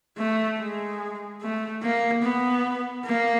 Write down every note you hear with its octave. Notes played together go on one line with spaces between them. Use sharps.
A3
G#3
A3
A#3
B3
A#3